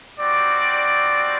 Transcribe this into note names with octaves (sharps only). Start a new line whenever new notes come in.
G3 C4 D#4 F#4 D5